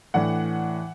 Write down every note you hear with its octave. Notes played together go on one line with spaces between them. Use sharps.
A2 E3 D4 F#5